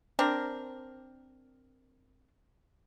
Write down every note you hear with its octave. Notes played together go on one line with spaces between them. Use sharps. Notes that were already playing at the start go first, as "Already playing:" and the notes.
C4 D4 A#4